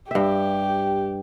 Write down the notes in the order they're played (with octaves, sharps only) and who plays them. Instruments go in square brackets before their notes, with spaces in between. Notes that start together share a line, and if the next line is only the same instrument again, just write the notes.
[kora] G2 E5 [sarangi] G4